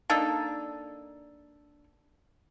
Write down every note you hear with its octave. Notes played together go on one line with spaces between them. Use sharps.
A#3 D4 D#4 A4